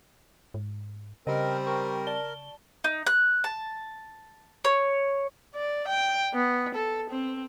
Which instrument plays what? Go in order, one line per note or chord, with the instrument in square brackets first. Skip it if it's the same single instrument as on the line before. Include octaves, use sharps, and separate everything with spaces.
[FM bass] G#2
[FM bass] C#3 [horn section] G3 C4 [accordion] A#4 [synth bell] D#5
[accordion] A#4 [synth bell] C#6
[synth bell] D5 A5 G7
[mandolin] D#4
F#6
A5
C#5
[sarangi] D5
G5
B3
A4
C4